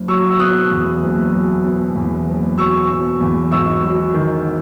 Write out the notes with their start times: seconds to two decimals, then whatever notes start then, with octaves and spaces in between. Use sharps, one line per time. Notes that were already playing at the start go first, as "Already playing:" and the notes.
Already playing: F#1
0.08 F#3 C#6 E6
0.30 E6
0.39 B2 D#6 F#6
0.71 E2
1.02 F#1
1.33 F#3
1.65 B2
1.95 E2
2.27 F#1
2.58 F#3 C#6 E6
2.90 B2
3.21 E2
3.51 G#1 C#6 E6
3.83 F#3
4.14 D#3